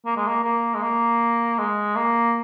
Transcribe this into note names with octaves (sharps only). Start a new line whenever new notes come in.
A#3
G#3
A#3
A#3
G#3
A#3
G#3
A#3